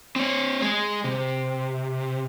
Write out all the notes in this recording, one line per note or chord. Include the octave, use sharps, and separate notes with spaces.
C4 C#5
G#3 G#4
C3